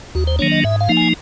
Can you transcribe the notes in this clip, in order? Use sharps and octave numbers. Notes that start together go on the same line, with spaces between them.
D#2 F#4
C5
D#3 F#3 A#3 D4 C#5
D#5
G#2 E5
F5
F3 A#3 D#4
G#5